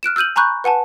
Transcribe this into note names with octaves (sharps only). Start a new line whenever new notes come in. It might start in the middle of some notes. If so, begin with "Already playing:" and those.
F6 F#6 D7 E7
E6 F6 G6 D#7 F#7
G#5 A#5 B5 C#6 F#6 G6
B4 F#5 G#5 A5